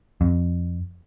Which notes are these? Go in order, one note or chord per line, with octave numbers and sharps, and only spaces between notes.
F2